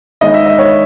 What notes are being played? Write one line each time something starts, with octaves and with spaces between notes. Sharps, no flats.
D#2 D#3 G#3 D#5
E5
D#5
C#5